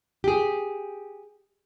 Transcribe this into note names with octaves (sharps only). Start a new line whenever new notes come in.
G4 G#4